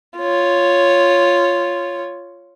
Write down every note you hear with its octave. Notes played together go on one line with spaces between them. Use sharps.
F4 C#5